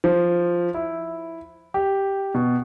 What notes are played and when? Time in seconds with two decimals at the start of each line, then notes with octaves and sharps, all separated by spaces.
0.04 F3
0.74 E4
1.74 G4
2.34 B2